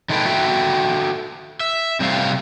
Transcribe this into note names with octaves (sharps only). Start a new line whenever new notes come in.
D#3 E3 G#3 A4 B4 G5
F#4 A4 E5 G5
E5
C3 G3 A3 C4 F5